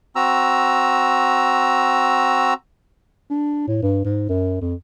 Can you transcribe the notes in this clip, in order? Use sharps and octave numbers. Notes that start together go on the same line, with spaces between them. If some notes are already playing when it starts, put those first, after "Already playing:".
C4 F#4 A#5 E6
D4
A2
G2
G#2
F#2
F2